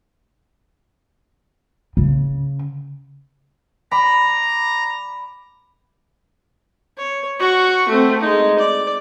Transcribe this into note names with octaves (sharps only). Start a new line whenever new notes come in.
C#3
D5 A#5 B5
C#5
F#4 C#6
A3 C4
G#3 D#4
D5